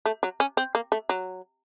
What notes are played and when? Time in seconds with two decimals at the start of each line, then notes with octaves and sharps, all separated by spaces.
0.06 A3
0.23 F#3
0.40 C#4
0.57 C4
0.75 A#3
0.92 A3
1.09 F#3